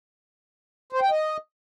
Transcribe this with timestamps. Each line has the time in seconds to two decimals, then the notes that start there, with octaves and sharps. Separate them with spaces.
0.93 C5
1.01 G5
1.10 D#5